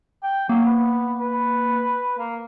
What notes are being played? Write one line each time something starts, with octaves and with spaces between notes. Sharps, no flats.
G5
F#3 A#3
B3
B4
A#3